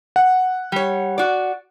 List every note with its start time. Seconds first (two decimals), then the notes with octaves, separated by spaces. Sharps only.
0.16 F#5
0.72 G3 C#5
1.18 F#4 D5